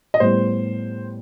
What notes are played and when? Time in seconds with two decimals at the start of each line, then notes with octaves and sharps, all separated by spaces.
0.14 D#5
0.20 A2 G3 B3 C5